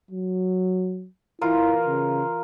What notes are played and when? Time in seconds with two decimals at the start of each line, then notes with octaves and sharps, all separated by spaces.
0.11 F#3
1.41 E3 E4 F4 A#4
1.87 C#3